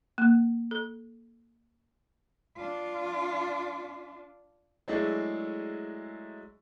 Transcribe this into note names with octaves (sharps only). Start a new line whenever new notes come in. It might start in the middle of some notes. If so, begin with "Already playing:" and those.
A#3
A4
D4 F4
F#3 G#3 A3 D4 E4 G#4